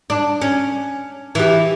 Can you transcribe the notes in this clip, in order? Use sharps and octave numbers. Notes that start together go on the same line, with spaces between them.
D4
C#4
E3 G4